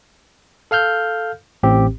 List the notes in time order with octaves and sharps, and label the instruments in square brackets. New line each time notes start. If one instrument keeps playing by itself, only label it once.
[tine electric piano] A4 F5 F6 G6
A1 A2 C4 G4